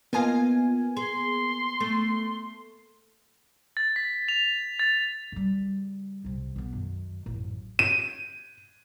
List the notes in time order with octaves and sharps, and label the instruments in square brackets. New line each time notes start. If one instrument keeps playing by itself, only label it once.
[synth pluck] A#3 B3 G#5 [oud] F4 D#5 F5
[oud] G#4 [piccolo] C6
[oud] A3
[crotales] A6
B6
F7
A6
[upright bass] C#3 G3
C2 C3
B1 B3
F#2 D#3
A1 F#2
[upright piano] D#7